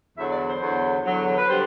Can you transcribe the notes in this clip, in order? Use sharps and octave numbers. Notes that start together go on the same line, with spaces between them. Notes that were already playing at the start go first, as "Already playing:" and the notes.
E2 D3 F#3 E5
D5
C5
E2 D3 F#3
E2 D3 F#3
B4
D3 G3 C5